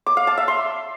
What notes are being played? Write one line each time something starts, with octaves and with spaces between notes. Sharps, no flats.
D6
F5
A5
E5
C6